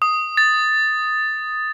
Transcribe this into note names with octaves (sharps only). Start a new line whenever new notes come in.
D#6
A6